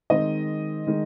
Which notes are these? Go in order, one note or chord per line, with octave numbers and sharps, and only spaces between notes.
D#3 G#3 C4 D#5
D#3 G#3